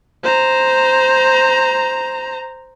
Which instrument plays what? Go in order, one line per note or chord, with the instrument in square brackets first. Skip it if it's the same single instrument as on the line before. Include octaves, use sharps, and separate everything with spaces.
[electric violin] C5 A#5